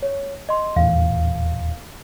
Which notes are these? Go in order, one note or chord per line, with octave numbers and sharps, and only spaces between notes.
C#5
D#5 C6
D#1 E2 A2 F5